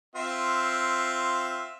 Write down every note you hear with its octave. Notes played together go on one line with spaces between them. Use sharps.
C4 F4 E5